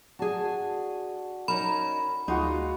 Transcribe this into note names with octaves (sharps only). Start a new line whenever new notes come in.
D4 F#4 G#4 A5
C#4 D#4 A#4 B5
D2 G#3 D#4 F4 F#4 D#5